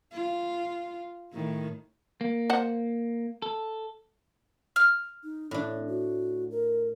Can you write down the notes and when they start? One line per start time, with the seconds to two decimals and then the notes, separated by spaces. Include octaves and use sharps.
0.13 F4
1.34 A2 D#3
2.21 A#3
2.50 C5 F#5
3.42 A4
4.76 F6
5.24 D#4
5.51 A2 C#4 D4
5.88 F#4
6.51 A#4